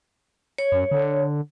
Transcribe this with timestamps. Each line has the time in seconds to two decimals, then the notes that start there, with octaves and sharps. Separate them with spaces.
0.58 C#5
0.72 F#2
0.91 D3